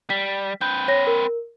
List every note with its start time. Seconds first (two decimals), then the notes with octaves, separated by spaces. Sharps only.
0.10 G3 B6
0.61 C4 B4 G6
0.88 C#5 A#6
1.07 A#4